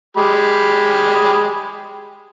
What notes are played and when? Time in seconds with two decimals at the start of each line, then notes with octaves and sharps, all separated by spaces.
0.17 G#3 G4 B5